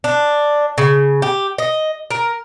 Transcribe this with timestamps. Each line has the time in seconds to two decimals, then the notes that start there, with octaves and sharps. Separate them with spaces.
0.04 D4
0.78 C#3
1.22 G4
1.58 D#5
2.10 A#4